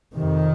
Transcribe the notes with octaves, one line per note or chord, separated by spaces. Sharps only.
F2 C3 D#3